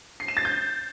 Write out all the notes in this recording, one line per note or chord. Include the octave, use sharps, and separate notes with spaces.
C7
E7
A6
G6